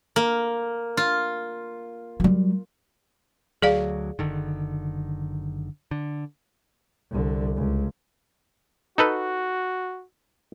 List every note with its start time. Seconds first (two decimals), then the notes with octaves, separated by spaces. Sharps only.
0.16 A#3
0.97 F4
2.20 F#3 G3
3.62 D2 F#3 G#4 D5 F5
4.19 F#1 D3 D#3
5.91 D3
7.11 C2 D3
7.56 C#2
8.98 D#4 F#4 A4 B4